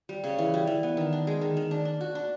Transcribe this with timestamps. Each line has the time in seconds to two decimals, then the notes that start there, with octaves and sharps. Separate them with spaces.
0.09 G3
0.24 C#3
0.38 E3
0.54 G3
0.67 E3
0.83 B3
0.97 D#3
1.12 D4
1.27 G#3
1.41 D#3
1.57 D#3
1.71 D4
1.85 D4
2.01 F#4
2.15 D4